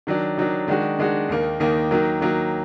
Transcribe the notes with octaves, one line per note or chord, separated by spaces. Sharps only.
D#3 F#3 D4
D#3 F#3 D4
D#3 G#3 D4 F#4
D#3 G#3 D4 F#4
D#2 D#3 A#3
D#2 D#3 A#3
D#3 F#3 A#3
D#3 F#3 A#3